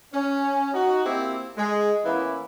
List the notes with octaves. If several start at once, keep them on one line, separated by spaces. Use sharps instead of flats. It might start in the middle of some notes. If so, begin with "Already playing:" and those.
C#4
D#4 F#4
A#3 C4 E4 G4
G#3
E3 A#3 B3 C#4 E4